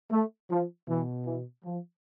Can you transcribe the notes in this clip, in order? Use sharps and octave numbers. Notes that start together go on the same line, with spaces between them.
A3
F3
B2 E3
E3
F3